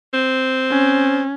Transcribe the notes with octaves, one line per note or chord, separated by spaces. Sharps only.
C4
C#4